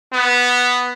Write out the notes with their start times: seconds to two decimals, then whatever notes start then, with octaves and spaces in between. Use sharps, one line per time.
0.13 B3